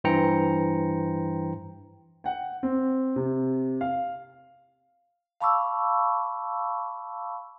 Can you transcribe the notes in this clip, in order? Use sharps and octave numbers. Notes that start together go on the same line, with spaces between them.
G2 E3 C5 G5 A#5 C#7
F#5 G5
C4
C3
F5
F5 A5 B5 C#6 D6 E6